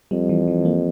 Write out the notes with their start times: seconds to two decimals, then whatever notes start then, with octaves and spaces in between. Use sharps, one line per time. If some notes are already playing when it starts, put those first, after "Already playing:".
0.11 F2 G3
0.29 E3
0.48 E3
0.65 A#3